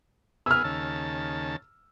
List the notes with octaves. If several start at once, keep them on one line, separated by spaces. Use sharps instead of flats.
B3 G#4 E6 F6
D#2 C#3 A5